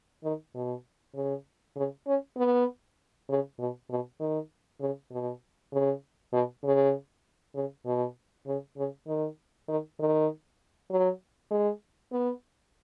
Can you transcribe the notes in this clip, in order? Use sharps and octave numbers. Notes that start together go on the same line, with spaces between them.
D#3
B2
C#3
C#3
C#4
B3
C#3
B2
B2
D#3
C#3
B2
C#3
B2
C#3
C#3
B2
C#3
C#3
D#3
D#3
D#3
F#3
G#3
B3